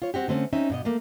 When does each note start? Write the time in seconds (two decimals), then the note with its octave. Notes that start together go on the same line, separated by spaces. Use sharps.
0.02 F4 C#5
0.14 C4 F#4 G4
0.28 D3 A3 C4 C#4
0.53 C4 C#4 D#4 E5
0.70 G2 B2 D#5
0.85 A3 A#3